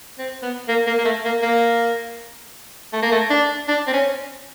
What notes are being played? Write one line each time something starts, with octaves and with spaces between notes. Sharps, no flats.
C4
B3
A#3
A#3
A#3
A3
A#3
A#3
A3
A#3
A3
D4
D4
C4
C#4